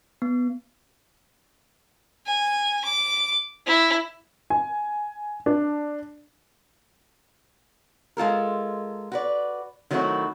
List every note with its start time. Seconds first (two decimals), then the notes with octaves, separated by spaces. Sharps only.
0.22 B3
2.27 G#5
2.84 D6
3.67 E4
4.50 G#5
5.46 D4
8.17 G#3 F4 A4 A#4
9.12 F#4 B4 D5
9.91 D#3 F#3 A3 C4 E4 F#4